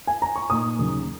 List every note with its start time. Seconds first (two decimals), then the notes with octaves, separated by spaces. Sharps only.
0.07 G#5
0.22 A#5
0.36 C#6
0.50 A#2 A#3 D#4 D#6
0.79 D#2 C#3 F#3